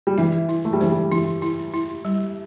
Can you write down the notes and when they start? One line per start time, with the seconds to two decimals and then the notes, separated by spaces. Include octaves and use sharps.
0.07 G3
0.18 E3 E5
0.49 E4
0.65 A3
0.73 G3
0.81 E3 C5
0.91 G3
1.12 E3 E4
1.42 E4
1.74 E4
2.05 G3